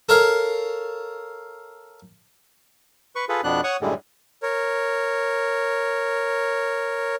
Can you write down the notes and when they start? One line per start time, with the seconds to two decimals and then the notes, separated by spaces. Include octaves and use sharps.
0.09 A4 A#4 C#5 F5
3.16 B4 C#6
3.29 F4 G#4 A4 B4
3.44 F2 B2 B3 D4 F#6
3.64 C#5 F#5 C#6 D#6
3.81 F#2 A2 D3 G3 G#3
4.43 A#4 C#5